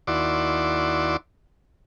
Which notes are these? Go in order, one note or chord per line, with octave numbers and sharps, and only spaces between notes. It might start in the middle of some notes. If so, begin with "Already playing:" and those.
D#2 E4 F#4 D5 C6 D6